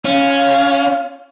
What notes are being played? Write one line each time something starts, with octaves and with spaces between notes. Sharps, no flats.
C#4 F5